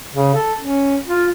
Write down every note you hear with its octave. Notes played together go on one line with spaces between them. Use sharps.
C#3
A4
C#4
F4